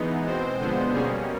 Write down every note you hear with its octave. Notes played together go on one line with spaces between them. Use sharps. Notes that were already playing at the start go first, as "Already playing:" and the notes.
Already playing: E3 G#3 B3 D#4
B2 G#3 C4 C5
D3 F3 G#3 B3 C5
B2 G3 A#3 C#4 G#4